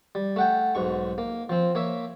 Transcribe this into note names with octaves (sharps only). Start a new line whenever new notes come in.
G3
A3 F#5 G5
B1 G#2 C#6
A#3
F3 C4
A#3 C#5 E5